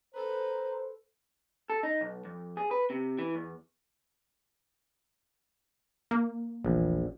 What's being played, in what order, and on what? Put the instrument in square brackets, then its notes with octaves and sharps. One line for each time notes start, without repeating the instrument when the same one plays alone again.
[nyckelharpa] A4 B4 [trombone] C5 [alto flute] A#5
[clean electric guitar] A4
D#4
B1
F2
G#4
B4
C3
E3
E2
[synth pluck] A#3
[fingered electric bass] E1 E3 A3 [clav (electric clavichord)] A#1